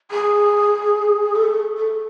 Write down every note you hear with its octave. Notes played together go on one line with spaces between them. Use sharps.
G#4
A4
A4